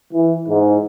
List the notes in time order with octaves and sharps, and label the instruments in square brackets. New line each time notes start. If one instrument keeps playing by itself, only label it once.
[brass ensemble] E3
G#2